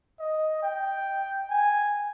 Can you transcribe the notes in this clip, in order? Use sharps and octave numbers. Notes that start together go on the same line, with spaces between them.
D#5
G5
G#5